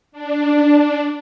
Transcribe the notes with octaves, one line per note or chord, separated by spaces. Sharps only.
D4